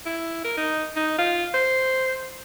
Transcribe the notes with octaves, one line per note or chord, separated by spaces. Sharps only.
E4
A#4
D#4
D#4
F4
C5